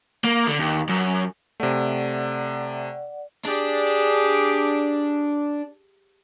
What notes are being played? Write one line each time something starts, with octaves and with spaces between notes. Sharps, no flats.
A#3
D3
D#2
F#2
C3 A3 D5 F#5
D4 G4 G#4